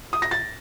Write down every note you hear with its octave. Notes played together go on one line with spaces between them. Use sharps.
D#6
A#6
A6